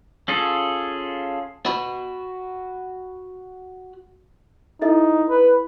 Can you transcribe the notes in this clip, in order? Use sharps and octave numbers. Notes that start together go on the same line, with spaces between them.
C#4 F4 G#4 A4
F#4 B5
D#4 E4 A4 E5
B4